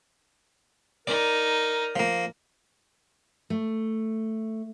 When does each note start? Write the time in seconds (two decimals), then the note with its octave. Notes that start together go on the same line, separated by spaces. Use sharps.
1.07 D#4 A#4 D5
1.96 F3 A#3
3.50 A3